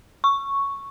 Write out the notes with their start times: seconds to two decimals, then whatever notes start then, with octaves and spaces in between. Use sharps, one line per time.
0.24 C#6